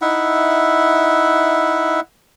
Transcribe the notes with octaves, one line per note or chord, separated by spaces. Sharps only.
D#4 E4 E5 F#5